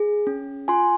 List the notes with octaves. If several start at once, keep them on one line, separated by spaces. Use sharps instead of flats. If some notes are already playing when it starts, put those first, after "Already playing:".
Already playing: G#4
C#4
F4 G#5 C6